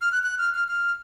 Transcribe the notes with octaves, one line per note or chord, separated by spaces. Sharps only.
F6
F#6
F#6
F6
F6
F6